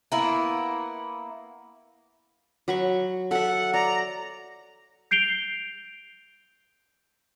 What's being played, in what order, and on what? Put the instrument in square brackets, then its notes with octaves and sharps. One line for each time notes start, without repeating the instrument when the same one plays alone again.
[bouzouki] A#3 B3 E4
[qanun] F#3 B5 C#6
[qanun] A4 E5 [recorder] F#5
[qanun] D5 [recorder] A#5
[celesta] G6 C7 D7 F7 G7